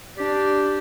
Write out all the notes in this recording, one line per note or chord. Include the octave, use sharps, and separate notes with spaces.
D4 G4